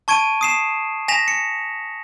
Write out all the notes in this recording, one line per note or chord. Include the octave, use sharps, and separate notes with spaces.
A5 C#6 G#6 D7 D#7
D#6 C7 E7
G#5 A#6 B6 E7 F7
C#7